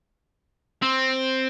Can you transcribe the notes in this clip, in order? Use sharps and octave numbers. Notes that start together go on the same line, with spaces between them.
C4